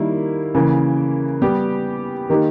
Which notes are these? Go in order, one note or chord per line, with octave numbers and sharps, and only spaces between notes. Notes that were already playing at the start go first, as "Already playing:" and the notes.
Already playing: D#3 G3 A#3 E4
C#3 E3 A#3
G3 B3 G4
D#3 A#3 D#4 G4